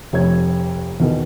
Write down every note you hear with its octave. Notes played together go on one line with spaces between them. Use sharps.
F1 F2 C#5 G#6
E2 B2 D#3